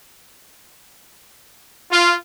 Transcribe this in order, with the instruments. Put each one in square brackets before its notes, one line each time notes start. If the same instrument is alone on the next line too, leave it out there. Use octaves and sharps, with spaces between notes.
[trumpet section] F4